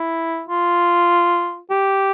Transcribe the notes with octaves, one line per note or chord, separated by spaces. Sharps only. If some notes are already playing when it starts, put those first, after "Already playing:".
Already playing: E4
F4
G4